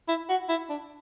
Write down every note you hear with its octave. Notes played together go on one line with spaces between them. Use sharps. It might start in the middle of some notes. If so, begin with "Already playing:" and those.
E4
F#4
E4
D4